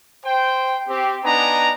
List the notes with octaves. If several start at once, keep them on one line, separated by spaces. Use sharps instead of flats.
C5 G5
C4 G4
B3 D4 D#4 G#5 A#5